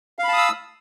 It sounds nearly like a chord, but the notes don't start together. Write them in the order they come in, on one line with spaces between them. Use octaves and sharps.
F5 B5 A5 D#6 E6